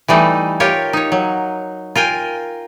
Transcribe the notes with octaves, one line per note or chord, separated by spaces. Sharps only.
E3 G3 A3 D#4
F4 G4 A#4 C#5
D#4 C#5
F#3
F4 A#4 G5 G#5